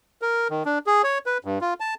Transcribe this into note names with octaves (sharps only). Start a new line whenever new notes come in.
A#4
D#3
D4
G#4
C#5
B4
G2
F4
A5